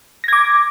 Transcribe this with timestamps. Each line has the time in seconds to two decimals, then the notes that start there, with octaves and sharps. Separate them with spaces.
0.24 A#6
0.28 G#6
0.33 D6